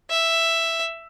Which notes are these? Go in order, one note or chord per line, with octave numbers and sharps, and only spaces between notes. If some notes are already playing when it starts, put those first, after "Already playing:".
E5